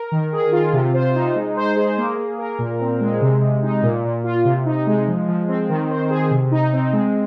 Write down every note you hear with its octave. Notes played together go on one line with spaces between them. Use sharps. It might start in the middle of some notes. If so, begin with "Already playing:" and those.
Already playing: A#4
D#3
G#4
F4
C3
C5
D#4
G#3
C5
G#4
A#3
A#3
A#4
A#2
C4
G#3
C3
C3
D#4
A#2
A#2
F4
C3
D#4
G#3
F3
F3
C4
D#3
C5
G#4
C3
D#4
C4
G#3